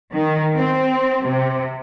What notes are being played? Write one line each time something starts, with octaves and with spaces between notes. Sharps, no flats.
D#3
C4
C3